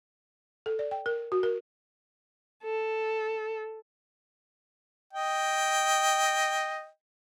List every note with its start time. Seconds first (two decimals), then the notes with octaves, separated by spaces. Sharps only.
0.66 A4
0.79 D5
0.91 G5
1.06 A#4
1.32 F#4
1.43 A#4
2.64 A4
5.13 D#5 G5